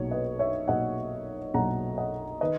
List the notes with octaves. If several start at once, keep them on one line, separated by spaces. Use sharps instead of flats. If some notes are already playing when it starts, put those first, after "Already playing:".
Already playing: B1 A#2 F#3 C#5
B4 D#5
C#5 E5
B1 A#2 F#3 D#5 F#5
B1 A#2 F#3 F#5 A#5
D#5 F#5
D#3 B4 D#5